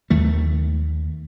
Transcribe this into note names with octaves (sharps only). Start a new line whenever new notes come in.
D#2 D#3 A3